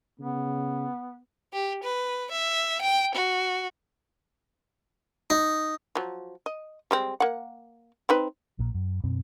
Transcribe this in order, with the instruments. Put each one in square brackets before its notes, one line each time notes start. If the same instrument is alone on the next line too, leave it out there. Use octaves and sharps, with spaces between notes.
[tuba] C#3 [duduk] B3
[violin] G4
B4
E5
G5
F#4
[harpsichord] D#4
[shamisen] F3 F#3
D#5
G3 G#3 C4
A#3 F#5
C4 D#4 B4
[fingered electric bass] A#1 A#2
F#2
F#2 B2 C4